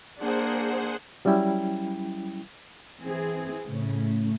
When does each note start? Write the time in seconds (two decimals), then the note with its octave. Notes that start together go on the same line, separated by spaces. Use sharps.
0.18 A#3 D4 G#4 C5 F#5
1.25 F#3 G3 C#4 E4 G5
3.02 E3 C4 E4 G#4
3.67 A2 C#3 A3 C#4